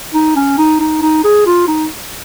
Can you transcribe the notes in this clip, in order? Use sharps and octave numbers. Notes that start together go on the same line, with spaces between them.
D#4
C#4
D#4
D#4
D#4
G#4
F4
D#4